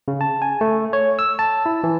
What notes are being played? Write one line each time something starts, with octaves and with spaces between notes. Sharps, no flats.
C#3
A5
G#5
A3
C#5
E6
A5
E4
E3